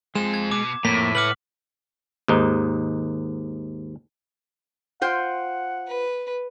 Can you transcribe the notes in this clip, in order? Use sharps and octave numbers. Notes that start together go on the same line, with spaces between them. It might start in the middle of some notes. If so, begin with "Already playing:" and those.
G#3 C4 F4 E7
G#6
B2 D6
F2 A2 A#3 B6
C#2 B4 F#5 D6 F6 F#7
D#2 G#2 D#4
F4 C5 F#5 G5
B4